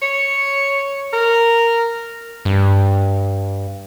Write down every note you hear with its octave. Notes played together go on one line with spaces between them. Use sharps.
C#5
A#4
G2